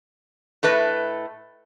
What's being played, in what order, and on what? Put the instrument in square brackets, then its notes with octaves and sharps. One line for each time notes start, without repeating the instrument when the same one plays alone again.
[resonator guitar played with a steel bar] A2 A3 B4 D#5